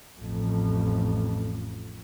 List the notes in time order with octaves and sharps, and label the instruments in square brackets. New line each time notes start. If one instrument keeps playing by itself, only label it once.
[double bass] A1 F2